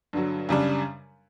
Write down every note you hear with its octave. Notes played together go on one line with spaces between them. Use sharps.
G2 D3 F#3
F#2 C#3 G3 D4